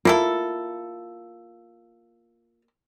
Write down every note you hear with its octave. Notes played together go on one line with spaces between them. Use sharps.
A#3 E4 F4 A4